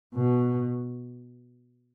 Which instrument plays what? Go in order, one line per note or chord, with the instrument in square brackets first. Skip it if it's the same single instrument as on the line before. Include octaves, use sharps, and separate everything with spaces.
[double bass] B2